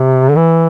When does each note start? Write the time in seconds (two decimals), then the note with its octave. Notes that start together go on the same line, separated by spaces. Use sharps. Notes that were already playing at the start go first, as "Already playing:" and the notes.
Already playing: C3
0.29 D3
0.36 E3